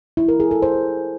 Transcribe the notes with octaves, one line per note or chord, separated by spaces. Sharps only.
E4
A#4
G#4
A4
C5